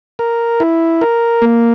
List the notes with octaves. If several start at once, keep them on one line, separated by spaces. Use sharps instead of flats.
A#4
E4
A#4
A#3